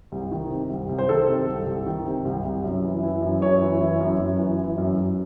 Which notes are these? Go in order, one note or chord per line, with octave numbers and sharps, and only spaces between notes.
C2
D#3
C3
C2
C2
C5
D#3 A4
C3
C2
C2
D#3
C3
C2
C2
F#2
E3
E3
F#2
F#2 C#5
E3
E3
F#2
F#2
E3
E3
F#2
F#2